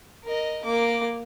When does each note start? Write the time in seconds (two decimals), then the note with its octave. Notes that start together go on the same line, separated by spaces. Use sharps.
0.24 A#4 D#5
0.64 A#3 D6